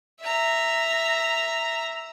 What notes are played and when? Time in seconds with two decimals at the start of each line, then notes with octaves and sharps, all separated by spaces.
0.22 E5 A#5